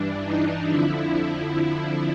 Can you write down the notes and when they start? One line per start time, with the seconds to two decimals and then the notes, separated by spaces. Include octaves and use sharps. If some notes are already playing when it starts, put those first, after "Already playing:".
Already playing: G2 E3 D4
0.25 D#4
0.70 F2 D3 F3 E4